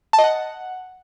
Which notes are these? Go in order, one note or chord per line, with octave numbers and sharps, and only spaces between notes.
A5
D#5
F#5